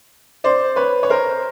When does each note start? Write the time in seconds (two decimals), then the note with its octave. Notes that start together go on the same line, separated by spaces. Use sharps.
0.44 C5 D5
0.76 B4 C#5
1.03 C#5
1.09 A#4 C5